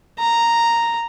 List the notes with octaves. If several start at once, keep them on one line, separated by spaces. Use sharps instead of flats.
A#5